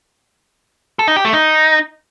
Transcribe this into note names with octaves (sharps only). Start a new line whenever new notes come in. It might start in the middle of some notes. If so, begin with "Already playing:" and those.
A4
D#4
G4
A3
D#4